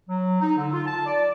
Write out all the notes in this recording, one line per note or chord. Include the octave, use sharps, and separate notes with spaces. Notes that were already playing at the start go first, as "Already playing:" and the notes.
F#3
D#4
D3
F4
A5
D5